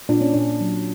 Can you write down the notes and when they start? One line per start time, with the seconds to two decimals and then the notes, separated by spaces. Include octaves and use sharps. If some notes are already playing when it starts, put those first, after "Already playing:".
0.09 A#2 D4
0.21 C#4
0.34 A#2 D4
0.61 F#3